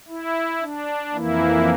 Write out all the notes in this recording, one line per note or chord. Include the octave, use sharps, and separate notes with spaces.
E4
D4
F2 E3 A#3 E4